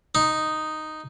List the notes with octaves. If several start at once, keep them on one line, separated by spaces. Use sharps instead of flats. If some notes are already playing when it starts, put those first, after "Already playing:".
D#4